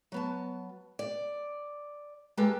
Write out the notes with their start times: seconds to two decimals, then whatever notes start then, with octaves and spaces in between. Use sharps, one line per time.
0.12 F#3 B3 A5
0.99 D5
2.37 G#3 A#3 G4 A4 B4